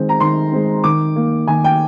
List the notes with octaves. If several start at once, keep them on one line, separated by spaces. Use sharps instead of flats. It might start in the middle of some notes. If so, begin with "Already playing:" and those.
Already playing: D#3 G#3 C4
A#5
D#3 C6
G#3 C4
D#3 D6
A#3
D#3 G#5
G5